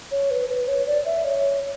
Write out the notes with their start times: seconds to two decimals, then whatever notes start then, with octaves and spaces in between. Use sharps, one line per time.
0.12 C#5
0.31 B4
0.50 B4
0.68 C#5
0.87 D5
1.06 E5
1.25 C#5